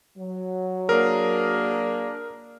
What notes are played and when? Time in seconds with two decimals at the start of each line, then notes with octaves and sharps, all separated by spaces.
0.18 F#3
0.89 A#3 D4 G#4 A#4